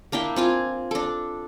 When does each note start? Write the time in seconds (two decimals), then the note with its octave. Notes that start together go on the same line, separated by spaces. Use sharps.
0.12 A#3 D4 E4 G5
0.36 C4 F4 G#5
0.91 D4 A4